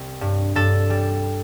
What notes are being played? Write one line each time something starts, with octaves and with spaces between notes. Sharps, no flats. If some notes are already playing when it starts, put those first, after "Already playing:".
Already playing: C2
G2
G2 A4
G3